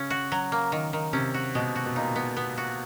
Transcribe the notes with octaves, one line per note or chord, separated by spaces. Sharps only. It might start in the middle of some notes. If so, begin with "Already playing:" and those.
Already playing: C#3 C#4
F#4
F#3
A#3
D#3
D#3
C3 C#4
F#4
B2 G#3
F#4
B2
A#2 D#4
B3
B3
F#4